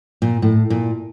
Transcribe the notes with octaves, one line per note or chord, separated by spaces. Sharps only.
A#2
A2
A#2